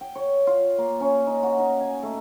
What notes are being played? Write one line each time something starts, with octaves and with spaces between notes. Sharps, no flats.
G5
C#5
F4
A#3
C#4
D#4
F#4
D#4
G#5
A3